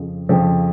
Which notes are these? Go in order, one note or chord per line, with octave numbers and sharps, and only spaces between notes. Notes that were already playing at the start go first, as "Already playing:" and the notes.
Already playing: F2 C#3 F3
F2 C#3 F3